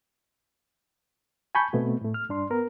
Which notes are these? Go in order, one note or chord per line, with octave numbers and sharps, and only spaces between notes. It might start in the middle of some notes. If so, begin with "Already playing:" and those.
G#5 A5 B5 C#6 G6
B2 A3 B3 C4
A2 A3
F6
G2 D4 C6
B3 A#4